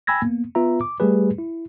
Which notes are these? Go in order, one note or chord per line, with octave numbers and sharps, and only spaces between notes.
G5 G#5 B5 E6 G#6 A#6
A#3 B3
B3 F4 B4 E5 A#5
D6
G3 A3 G4 G#4 B4
E4